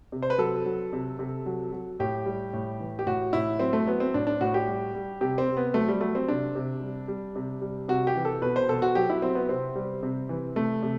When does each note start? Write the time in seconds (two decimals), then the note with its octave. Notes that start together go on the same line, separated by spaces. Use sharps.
0.12 C3
0.22 C5
0.30 B4
0.38 F#3 A4
0.66 F#3
0.93 C3
1.19 C3
1.46 F#3
1.72 F#3
1.99 A2 G4
2.26 G3
2.53 A2
2.80 E3
2.99 G4
3.07 A2 F#4
3.33 A2 E4
3.60 F#3 C4
3.73 A3
3.86 F#3 B3
4.00 C4
4.14 A2 D4
4.27 D4
4.41 A2 F#4
4.54 G4
4.67 G3
4.94 G3
5.21 C3 G4
5.38 C4
5.48 C3
5.57 B3
5.74 F#3 A3
5.88 G3
6.01 F#3 A3
6.15 C4
6.28 C3 D4
6.55 C3
6.82 G3
7.08 G3
7.36 C3
7.61 G3
7.89 C3 F#4
8.07 G4
8.16 E3
8.25 A4
8.42 B2 B4
8.56 C5
8.68 B2 A4
8.82 F#4
8.95 F#3 G4
9.09 E4
9.22 F#3 C4
9.35 B3
9.49 C3 C4
9.75 G3
10.03 C3
10.29 E3
10.56 C3 A3
10.83 C3